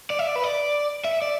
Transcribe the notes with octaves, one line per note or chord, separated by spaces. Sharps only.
D5
E5
D5
B4
D5
E5
D5